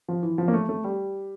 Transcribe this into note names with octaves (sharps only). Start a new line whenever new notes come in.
F3
E3
F3
A#3
A3
A3
G3